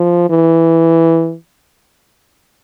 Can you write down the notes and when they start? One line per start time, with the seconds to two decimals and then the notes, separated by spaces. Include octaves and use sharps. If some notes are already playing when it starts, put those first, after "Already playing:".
Already playing: F3
0.30 E3